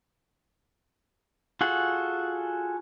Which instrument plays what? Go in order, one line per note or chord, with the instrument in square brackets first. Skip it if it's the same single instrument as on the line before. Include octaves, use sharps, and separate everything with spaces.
[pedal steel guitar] F4 F#4 G#4 A4 F#5